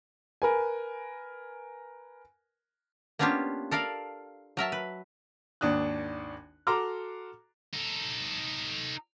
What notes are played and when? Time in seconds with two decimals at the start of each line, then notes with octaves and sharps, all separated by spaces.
0.42 A#4 B4 G#5
3.19 A#3 B3 C#4 D4 F4 G4
3.71 A4 A#4 D5 F5
4.57 F#3 A#4 E5 A5
4.72 B4
5.61 G#1 D#2 D4 D#6 F#6
6.67 F#4 A4 A#5 C6 D6 F6
7.74 D#4 A4